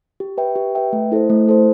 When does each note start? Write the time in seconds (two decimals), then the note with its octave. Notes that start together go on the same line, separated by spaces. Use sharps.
0.20 G4
0.38 B4 E5 G5
0.56 G4
0.75 B4 E5 G5
0.93 A3
1.12 E4 A4 C5
1.30 A3
1.48 E4 A4 C5